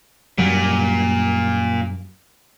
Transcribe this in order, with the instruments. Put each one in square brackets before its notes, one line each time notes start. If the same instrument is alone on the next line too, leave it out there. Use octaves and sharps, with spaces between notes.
[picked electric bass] F#2 F#3 G3 [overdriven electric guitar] A#2